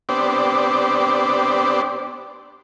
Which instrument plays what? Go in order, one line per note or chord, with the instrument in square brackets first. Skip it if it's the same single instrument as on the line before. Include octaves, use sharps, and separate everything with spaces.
[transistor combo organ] B3 C4 D4 G4 C5 D5